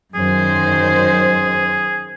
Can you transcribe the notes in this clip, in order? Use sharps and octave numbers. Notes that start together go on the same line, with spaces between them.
F#2 D#3 G#4 C5